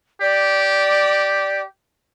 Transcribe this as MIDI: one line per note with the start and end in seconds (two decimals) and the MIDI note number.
0.21 1.66 67
0.21 1.61 74